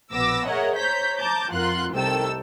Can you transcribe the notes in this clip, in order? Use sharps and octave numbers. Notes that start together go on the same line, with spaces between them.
A#1 B2 B3 D6 E6 A#6
G#4 A#4 C#5 D#5 E5 F#5
C5 C#5 A#5 G6 B6
A5 A#5 D6 G6
F2 F4 A#4 F#5 C6 F#6
C2 C3 D#3 A4 G5 E6